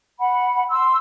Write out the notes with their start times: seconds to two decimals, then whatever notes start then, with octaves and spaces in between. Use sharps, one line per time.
0.20 F#5 B5
0.70 C6 E6